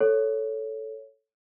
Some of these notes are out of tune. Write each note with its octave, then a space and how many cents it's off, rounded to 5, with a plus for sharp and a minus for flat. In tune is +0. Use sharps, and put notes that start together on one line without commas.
A4 +0 C#5 +0